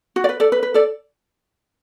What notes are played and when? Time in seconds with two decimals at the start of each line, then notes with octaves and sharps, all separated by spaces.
0.16 F#4
0.24 D5
0.29 B4
0.40 A4 D5
0.52 B4
0.63 B4
0.74 A4 D5